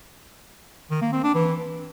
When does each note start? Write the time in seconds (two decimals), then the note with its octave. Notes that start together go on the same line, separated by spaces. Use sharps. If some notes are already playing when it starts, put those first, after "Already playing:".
0.90 D#3
1.01 A#3
1.12 C4
1.23 D4
1.34 E3